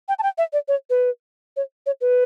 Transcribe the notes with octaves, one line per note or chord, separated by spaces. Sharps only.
G5
A5
G5
E5
D5
C#5
B4
C#5
C#5
B4